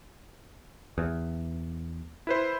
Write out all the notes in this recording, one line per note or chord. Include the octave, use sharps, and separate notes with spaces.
E2
E4 B4 C5